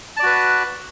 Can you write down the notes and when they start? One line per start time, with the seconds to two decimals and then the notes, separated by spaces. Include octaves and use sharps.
0.17 A5
0.20 D5
0.23 F#4
0.26 B4